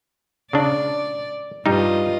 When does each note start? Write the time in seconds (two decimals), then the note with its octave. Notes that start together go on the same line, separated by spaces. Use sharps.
0.53 C#3 D4 D5
1.66 G2 G3 D#4 F4 D#5